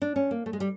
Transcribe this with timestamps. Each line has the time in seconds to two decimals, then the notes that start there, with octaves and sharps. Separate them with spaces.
0.02 D4
0.16 C#4
0.31 A#3
0.46 A3
0.53 G#3
0.60 G3